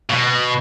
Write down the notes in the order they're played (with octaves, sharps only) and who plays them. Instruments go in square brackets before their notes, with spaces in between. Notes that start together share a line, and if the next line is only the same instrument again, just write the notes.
[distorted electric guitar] B2